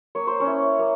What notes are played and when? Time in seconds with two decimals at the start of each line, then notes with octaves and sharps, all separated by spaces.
0.15 A#3 C#5
0.27 C5
0.40 C#4 C#5
0.47 E4
0.79 A#3